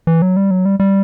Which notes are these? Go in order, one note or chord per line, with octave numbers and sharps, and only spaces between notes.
E3
F#3
G3
F#3
G3
G3